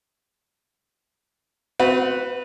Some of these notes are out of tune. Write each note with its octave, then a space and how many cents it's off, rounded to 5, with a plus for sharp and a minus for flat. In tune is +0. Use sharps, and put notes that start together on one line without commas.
C4 -25 F#4 +0 B4 +0